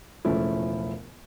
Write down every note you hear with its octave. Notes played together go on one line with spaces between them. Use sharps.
E1 C#2 F3 A3 C#4 E4